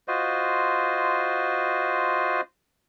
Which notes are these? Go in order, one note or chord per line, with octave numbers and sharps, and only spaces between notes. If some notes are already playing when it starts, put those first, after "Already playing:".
F4 F#4 C5 D#5